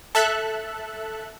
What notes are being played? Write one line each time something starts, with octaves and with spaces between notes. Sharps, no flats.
A4 E5 F#6